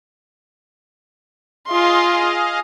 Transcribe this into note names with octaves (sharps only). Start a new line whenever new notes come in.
F4 G#4 D#5 F5 C6